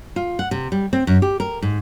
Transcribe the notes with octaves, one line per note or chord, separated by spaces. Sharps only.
F4
F#5
C3
G3
C4
F#2
G4
A#4
G#2